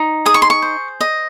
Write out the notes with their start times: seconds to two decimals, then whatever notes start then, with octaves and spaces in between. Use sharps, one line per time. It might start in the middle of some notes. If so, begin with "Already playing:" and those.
Already playing: D#4
0.26 G#4 D#6
0.34 C#6
0.42 C6
0.50 C#6
0.62 C5
1.01 D#5